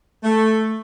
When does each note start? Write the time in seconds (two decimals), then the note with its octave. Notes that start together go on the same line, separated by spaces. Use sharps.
0.24 A3